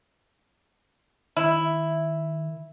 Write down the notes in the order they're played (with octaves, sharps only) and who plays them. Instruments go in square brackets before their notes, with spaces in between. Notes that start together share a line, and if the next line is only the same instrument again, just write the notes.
[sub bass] D#3 [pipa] E4